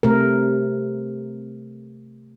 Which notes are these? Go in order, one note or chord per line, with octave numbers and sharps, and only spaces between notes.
C3 A3 A#4